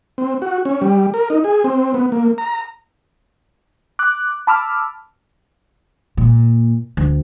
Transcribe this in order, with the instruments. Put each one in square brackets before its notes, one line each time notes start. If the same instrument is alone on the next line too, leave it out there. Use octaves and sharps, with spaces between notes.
[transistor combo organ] C4
F#4
C#4
G3
A#4
D#4
G#4
C4
B3
A#3
A#5
[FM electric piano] D6 F#6
A5 B5 D6 E6 F6
[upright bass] A#2
D2